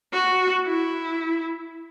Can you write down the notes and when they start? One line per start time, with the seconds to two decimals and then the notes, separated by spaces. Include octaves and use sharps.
0.13 F#4
0.66 E4